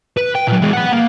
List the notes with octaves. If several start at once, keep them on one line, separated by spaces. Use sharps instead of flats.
B4
G5
A#2 F#3
E3 G#3
B4 F#5
A#3